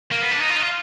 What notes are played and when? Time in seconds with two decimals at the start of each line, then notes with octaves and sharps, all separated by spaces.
0.12 A#3
0.21 B3
0.31 D4
0.40 D#4
0.50 F4
0.56 D#4
0.62 F4